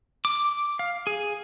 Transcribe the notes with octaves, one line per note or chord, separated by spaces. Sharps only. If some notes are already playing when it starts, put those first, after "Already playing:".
D6
F5
G#4